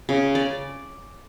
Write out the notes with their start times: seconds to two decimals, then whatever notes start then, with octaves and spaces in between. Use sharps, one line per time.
0.09 C#3
0.35 D5